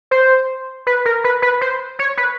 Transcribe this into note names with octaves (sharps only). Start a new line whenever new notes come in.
C5
B4
A#4
B4
B4
C5
C#5
B4